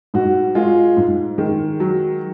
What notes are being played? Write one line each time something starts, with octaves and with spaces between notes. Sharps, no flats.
G#2 F#4
G#3 F4
G#2
D#3 G#3
F#3